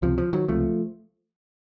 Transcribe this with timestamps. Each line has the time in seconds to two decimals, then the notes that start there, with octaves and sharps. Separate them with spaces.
0.02 C#2 C3 F3
0.18 F3
0.33 D#3 F#3
0.48 C#2 C3 F3 A3